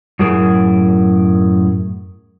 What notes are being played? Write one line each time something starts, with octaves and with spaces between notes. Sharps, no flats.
F#2 A2 G#4 A#4